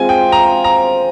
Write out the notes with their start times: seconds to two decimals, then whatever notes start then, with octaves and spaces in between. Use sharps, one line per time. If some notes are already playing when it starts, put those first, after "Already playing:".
Already playing: G#3 C4 F4 G#5
0.09 G5
0.32 A#5
0.64 A#5